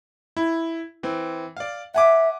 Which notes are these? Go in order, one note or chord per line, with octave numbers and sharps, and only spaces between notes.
E4
E3 C4
D5 F5
E5 F#5 G#5 D6